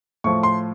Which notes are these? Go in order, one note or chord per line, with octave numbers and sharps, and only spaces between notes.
A2 F3 C#6
C6